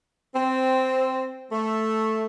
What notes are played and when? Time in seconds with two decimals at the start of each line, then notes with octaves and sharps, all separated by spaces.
0.35 C4
1.52 A3